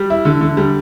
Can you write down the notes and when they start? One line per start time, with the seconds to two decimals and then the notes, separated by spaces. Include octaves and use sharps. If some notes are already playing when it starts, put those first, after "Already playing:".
Already playing: G3
0.10 E4
0.25 D3
0.41 D3
0.57 G3